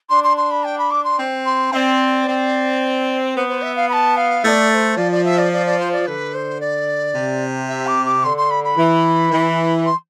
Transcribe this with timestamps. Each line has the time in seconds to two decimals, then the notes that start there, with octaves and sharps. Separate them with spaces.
0.10 D4 C6
0.24 C6
0.37 C6
0.51 B5
0.64 G5
0.78 B5
0.91 D6
1.04 C6
1.19 C4
1.45 C6
1.72 C4 D5 E5
2.27 C4
3.36 B3 C5
3.49 C5
3.62 E5
3.76 F5
3.89 B5
3.93 A5
4.16 F5
4.43 A3 D5 E5
4.71 D5
4.74 C5
4.97 F3 D5
5.12 D5
5.24 E5
5.38 D5
5.53 D5
5.66 D5
5.79 C5
5.92 D5
6.06 D3 B4
6.34 C5
6.60 D5
7.15 C3
7.69 E5
7.87 D6
8.06 D6
8.23 D3 C6
8.37 C6
8.50 B5
8.64 B5
8.77 E3
9.31 E3
9.86 C6